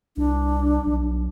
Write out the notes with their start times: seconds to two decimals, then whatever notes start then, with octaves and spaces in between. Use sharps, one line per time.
0.17 C2 D4
0.87 B1